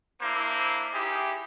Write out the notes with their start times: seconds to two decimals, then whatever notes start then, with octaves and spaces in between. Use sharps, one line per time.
0.21 A#3 D4 E4 C5
0.92 D#4 E4 G4 G#4